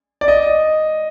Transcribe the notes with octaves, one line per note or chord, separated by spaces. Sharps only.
D5
D#5